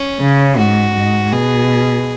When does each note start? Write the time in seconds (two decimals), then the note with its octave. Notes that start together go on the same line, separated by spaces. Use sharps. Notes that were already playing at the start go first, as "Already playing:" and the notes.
Already playing: C#4
0.20 C#3
0.57 G#2 F#4
0.94 G#2
1.32 B2 G#4